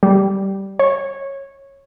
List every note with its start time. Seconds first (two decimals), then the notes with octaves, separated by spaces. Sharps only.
0.03 G3
0.79 C#5